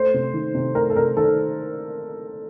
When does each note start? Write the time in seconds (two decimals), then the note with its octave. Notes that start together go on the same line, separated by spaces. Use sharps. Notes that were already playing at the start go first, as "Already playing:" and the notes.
Already playing: A3 C5
0.14 C3
0.34 D#3
0.55 C3
0.75 A3 A#4
0.90 A4
0.96 C3 A#4
1.17 D#3 A4